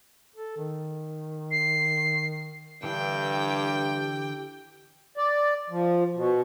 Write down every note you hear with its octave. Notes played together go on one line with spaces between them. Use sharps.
A4
D#3
C7
G2 D3 E3 E4 G4 G5
D5
F3
B2